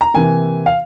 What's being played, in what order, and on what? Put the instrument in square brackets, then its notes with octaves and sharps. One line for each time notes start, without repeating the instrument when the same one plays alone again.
[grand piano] A#5
C3 E3 A#3 G#5
F5